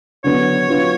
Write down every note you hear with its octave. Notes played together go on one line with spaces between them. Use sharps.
D3 F#3 B3 C#5
F#3 B3 D4 F4 B4